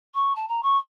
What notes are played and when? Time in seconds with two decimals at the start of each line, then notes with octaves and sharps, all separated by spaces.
0.14 C#6
0.35 A5
0.48 A#5
0.63 C#6